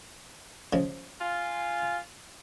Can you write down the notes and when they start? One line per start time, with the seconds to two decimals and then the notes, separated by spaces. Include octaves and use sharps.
0.73 C#3 F3 G#3
1.21 F4 G#5